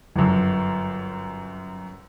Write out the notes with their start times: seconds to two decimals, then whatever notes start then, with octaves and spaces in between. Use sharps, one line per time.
0.16 G1 F#2